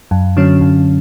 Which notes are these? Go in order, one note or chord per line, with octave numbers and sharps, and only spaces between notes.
F#2
D3 F#3 C#4
F#2